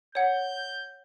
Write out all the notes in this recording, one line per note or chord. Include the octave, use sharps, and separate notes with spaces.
C#5 F#5 G6